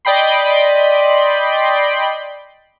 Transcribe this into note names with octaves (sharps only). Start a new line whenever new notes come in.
D5 D#5 G5 B5 C6